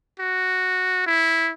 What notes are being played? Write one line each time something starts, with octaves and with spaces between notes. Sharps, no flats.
F#4
E4